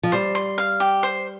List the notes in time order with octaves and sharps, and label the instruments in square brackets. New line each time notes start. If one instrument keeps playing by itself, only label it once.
[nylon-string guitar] F3
[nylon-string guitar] G3 [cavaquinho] C5
[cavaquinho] C6
F5
G4
C5